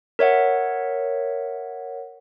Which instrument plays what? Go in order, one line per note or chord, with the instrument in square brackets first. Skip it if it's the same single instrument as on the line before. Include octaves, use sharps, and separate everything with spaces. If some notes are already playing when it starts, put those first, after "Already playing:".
[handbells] A#4 C#5 E5 F#5